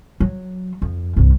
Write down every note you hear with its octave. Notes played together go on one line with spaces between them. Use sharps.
F#3
F2
C2 G2